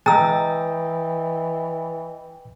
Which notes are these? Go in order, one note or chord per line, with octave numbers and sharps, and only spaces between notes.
E3 D#5 G5 A#5 E6 A6